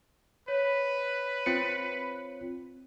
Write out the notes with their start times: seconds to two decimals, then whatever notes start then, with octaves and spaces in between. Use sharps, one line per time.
0.48 B4 C#5
1.46 C4 F4 C#7